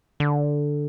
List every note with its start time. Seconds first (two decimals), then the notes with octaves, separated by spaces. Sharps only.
0.20 D3